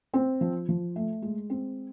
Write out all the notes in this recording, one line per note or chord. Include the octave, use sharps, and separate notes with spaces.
C4
F3
F3
A3
G#3
C4